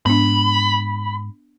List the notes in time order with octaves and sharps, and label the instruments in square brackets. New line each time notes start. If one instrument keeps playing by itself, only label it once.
[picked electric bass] G#2 [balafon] B3 D4 [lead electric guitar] B5